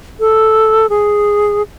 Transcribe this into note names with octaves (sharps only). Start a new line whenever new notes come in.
A4
G#4